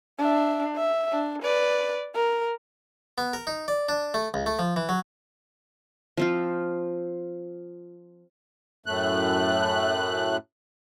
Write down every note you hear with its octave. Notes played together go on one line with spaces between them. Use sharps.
D4 E5
E5
D4
B4 D5
A#4
B3
A#4
D#4
D5
D4
A3
C#2
A3
F3
E3
F#3
F3 C4 F4
F#2 A2 A3 F#6